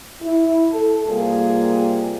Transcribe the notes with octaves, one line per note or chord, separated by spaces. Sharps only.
E4
A4
C3 G3 A#3 F4 G#4